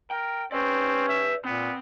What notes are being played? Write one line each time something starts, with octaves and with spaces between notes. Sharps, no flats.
A#4 G5
C4 C#4 B4 D5
E5
A#2 B3 C4